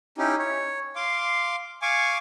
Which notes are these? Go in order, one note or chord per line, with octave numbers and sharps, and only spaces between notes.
C#4 D#4 E4 G4
C#5
F5 C6 D6
F5 G#5 C#6 D6